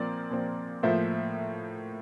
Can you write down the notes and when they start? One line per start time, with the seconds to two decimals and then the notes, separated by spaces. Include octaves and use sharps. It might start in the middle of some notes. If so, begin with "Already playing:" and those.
Already playing: A#2 F3 C4 A#4 D5
0.30 A#2 F3 C4
0.83 A2 F3 A#3 C5 E5